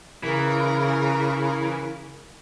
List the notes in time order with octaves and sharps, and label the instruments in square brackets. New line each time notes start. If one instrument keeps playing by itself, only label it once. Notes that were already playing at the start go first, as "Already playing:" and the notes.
[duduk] C#3 [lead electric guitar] E3 [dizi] A#4